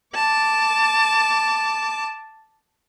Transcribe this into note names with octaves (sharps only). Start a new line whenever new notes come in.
A5 D6